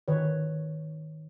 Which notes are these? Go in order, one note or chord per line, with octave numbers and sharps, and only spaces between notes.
D#3 B4 C#5